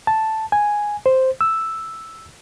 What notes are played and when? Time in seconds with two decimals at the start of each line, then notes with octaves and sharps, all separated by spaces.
0.07 A5
0.52 G#5
1.06 C5
1.41 E6